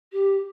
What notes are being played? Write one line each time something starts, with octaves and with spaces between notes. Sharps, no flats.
G4